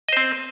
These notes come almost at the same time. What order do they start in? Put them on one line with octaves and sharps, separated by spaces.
D#5 C5 C4